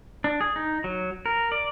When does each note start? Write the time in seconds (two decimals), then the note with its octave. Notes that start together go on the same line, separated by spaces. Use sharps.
0.24 D4
0.41 G#4
0.56 D#4
0.84 F#3
1.26 A#4
1.52 D5